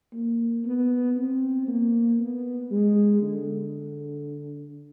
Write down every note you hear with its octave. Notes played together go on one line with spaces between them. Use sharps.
A#3
B3
C4
A#3
B3
G#3
D3